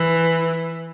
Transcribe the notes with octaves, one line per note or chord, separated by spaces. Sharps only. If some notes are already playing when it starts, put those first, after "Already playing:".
Already playing: E3